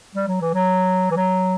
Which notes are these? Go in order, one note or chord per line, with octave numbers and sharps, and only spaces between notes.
G3
F#3
E3
F#3
E3
F#3